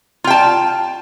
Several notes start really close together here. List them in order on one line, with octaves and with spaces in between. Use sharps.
F4 G5 A5